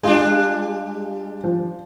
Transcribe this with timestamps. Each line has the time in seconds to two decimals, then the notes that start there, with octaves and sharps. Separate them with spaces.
0.03 G3 G#3 D4 F4
1.44 F3